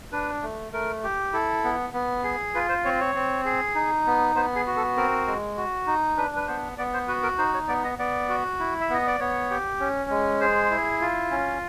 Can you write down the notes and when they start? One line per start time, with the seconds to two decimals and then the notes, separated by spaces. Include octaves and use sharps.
0.12 D4 B4
0.42 A3
0.73 A3 A#4
1.04 G4
1.33 E4 A4
1.64 B3
1.93 B3
2.24 G#4
2.55 F4 B4
2.69 C5
2.85 C4 C#5
3.00 C#5
3.15 C4
3.45 G#4
3.75 D#4
4.06 B3
4.36 B3 C5
4.56 G#4
4.67 F#4
4.77 A4
4.97 C4 A#4
5.27 G#3
5.57 F#4
5.87 D#4
6.17 D4 B4
6.36 B4
6.48 B3 C5
6.78 B3 D5
6.94 C5
7.08 F#4 B4
7.23 A#4
7.38 D#4 C5
7.54 C#5
7.68 B3 D5
7.85 D#5
7.99 B3 D5
8.29 F#4
8.59 E4
8.81 E5
8.90 B3 D#5
9.07 D5
9.20 B3 C#5
9.51 G4
9.80 C#4
10.10 G#3
10.41 G#4 C5
10.71 E4
11.01 F4
11.31 C#4